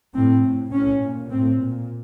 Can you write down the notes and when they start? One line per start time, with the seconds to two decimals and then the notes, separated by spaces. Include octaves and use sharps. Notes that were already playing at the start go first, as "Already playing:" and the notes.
0.14 A2 C4
0.44 A2
0.72 A2 C#4
1.02 A#2
1.31 A2 C4
1.60 A#2